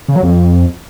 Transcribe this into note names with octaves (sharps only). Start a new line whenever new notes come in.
C#3
F#3
F2